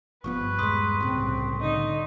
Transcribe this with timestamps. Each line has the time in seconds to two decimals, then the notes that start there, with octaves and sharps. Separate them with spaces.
0.24 G1 G2 F3 B3 B4 C#6
0.59 D#1 G#3 C6 D#6 B6
1.00 C2 A2 C#3 C4
1.61 D3 D#4